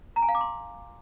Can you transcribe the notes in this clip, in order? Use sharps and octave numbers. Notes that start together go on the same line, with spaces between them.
A#5
G#5
F5
D6
C6